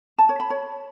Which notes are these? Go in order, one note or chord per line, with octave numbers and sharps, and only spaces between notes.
A5
C#5
B5
C#5